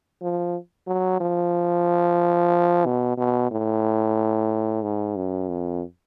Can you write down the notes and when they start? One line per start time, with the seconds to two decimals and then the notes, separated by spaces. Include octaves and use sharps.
0.22 F3
0.87 F#3
1.20 F3
2.85 B2
3.17 B2
3.51 A2
4.83 G#2
5.16 F#2
5.48 F2